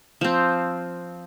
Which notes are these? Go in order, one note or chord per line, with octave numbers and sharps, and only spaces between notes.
F3 C4